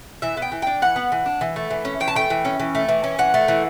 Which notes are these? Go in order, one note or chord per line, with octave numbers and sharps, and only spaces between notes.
E3 E5
B3
G5
E3
D4 G5
E3 F#5
B3
E3
D4
E3
A3
E3
C#4
E3 G5
A5
A3 G5
E3
C#4
E3
A3
E3
C#4
E3 F#5
A3
E3